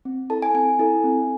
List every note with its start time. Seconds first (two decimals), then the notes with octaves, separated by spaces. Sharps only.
0.05 C4
0.30 E4 A4 A5
0.42 G#5
0.54 C4 G#5
0.79 E4 A4
1.04 C4